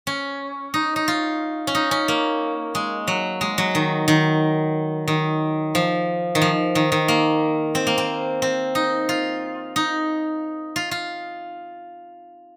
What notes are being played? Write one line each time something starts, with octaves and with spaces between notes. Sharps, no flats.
C#4
D#4
D#4
F4
C#4
D#4
C#4
A#3
G#3
F#3
G#3
F#3
D#3
D#3
D#3
F3
D#3
F3
D#3
D#3
A#3
C4
A#3
C4
C4
D#4
F4
D#4
F4
F4